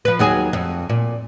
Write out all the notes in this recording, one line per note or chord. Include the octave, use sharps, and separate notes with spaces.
F3 B4
D#2 F#3 G#4
F2
A#2